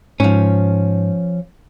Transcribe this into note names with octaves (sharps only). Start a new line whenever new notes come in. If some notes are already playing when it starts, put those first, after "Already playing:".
G#2 F3 C#4